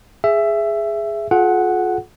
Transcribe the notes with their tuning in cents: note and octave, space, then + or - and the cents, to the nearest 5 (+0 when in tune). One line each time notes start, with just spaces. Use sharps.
G#4 +0 E5 +15
F4 +25 G#4 +45 F#5 +0